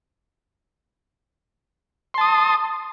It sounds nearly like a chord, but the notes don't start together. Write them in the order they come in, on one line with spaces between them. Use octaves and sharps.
C6 A5 D#6